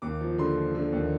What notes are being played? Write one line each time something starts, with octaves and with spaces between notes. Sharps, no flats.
D#2 D6
F3
D3 C6
F3
D3
D#2